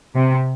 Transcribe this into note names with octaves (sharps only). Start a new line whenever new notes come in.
C3